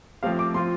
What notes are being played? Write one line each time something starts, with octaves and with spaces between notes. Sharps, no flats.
F3 A3 C4 G4 F5
D6
F3 C4 F4 C6